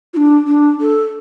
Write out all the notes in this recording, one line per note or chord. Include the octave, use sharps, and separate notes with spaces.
F4
D4
D4
A4